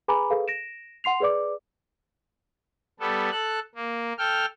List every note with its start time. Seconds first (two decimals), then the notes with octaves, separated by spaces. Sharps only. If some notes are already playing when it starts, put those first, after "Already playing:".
0.08 G#4 B4 G#5 A#5 B5 D6
0.30 G#4 A4 B4 F5
0.48 A#6 D7 E7
1.04 F#5 C6 C7 F7
1.20 G#4 B4 D5 D6
3.00 G3 B3 A4
3.32 A4 F#6
3.75 A#3
4.18 A4 G5 F6